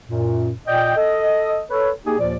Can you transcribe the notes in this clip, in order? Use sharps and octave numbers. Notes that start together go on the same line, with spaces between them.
F#2 A#2
A#2 D5 D#5 G5
A4 D#5
A4 B4 C#5
A#3 D#4 G4 G#4
D#2 A#2 F3 D5